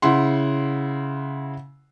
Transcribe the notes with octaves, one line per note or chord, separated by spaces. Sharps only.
C#3 E4 F#5 C6